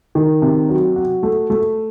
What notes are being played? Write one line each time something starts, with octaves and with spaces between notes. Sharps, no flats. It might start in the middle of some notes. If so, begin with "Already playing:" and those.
D#3
C3
F#3
F#4
A3
A3